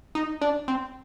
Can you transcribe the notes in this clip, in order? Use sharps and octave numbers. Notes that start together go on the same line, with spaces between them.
D#4
D4
C4